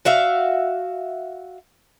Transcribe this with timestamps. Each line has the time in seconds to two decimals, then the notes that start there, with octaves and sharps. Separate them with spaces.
0.05 F#4 E5 F5